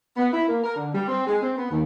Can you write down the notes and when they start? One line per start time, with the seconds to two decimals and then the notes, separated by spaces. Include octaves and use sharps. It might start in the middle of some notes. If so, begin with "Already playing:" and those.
0.17 B3
0.33 E4
0.48 A#3
0.64 A#4
0.75 D3
0.94 G3
1.08 C4
1.27 G#3
1.42 C4
1.57 B3
1.71 D#2